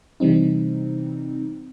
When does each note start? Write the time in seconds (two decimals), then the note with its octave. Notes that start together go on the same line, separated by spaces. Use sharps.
0.20 C3 E3 G3 C4 D#4